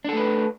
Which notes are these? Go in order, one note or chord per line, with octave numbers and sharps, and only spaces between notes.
A3 D4 A4 B4